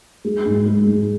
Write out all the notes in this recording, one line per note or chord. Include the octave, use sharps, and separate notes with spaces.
G#3
G#2
G#3
G#2